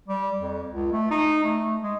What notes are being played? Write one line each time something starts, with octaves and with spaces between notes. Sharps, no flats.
G3
F2
C#2
A3
D#4
A3
G#3